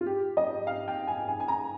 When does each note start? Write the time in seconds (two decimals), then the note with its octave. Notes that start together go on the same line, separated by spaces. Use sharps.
0.01 F4
0.06 G4
0.37 D#5
0.67 F5
0.88 G5
1.07 G#5
1.28 G#5
1.40 G#5
1.48 A#5